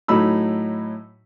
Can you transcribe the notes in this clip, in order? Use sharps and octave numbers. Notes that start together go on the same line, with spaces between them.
A2 F#3 D#4 B5 E6